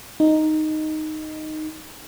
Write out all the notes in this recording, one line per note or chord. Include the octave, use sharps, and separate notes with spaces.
D#4